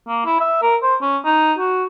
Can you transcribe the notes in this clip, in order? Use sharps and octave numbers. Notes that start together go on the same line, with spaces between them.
A#3
E4
E5
A#4
C5
C#4
D#4
F#4